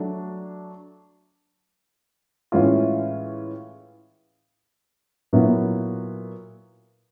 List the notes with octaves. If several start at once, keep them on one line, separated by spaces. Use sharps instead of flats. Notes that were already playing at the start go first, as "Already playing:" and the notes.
Already playing: F#3 A3 D4
A2 E3 G#3 C#4 F4
A#2 F#3 B3 E4